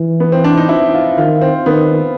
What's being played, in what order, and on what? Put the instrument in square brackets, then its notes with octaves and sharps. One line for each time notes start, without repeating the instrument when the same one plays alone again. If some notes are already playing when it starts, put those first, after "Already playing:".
Already playing: [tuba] E3
[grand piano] B3
C4
D4
D#4
E4
F4
[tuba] D#3 [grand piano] F4
[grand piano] C4
[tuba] D#3 [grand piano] B3